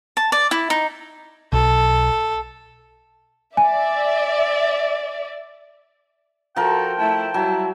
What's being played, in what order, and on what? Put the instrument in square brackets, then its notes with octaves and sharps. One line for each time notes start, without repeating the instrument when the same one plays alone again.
[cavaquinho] A5
D5
E4
D#4
[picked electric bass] B1 [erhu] A4
[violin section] D5 E5 [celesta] G#5
[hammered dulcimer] F3 A#4 [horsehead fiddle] F#4 A4 [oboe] G5
[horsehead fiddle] A3 E4 [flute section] A5
[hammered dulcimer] F#3 [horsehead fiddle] G3 E4